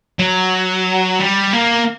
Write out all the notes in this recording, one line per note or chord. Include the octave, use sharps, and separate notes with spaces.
F#3
G3
A#3